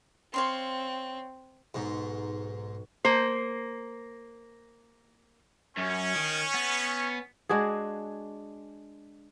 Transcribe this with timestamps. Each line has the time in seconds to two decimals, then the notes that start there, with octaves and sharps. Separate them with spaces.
0.34 C4 C#5 F5 C6
1.75 B1 G#2 B6
3.05 A#3 C5
5.77 F#2 C#4
6.15 D#3
6.54 B3
7.49 G#3 D4 F#4 G#4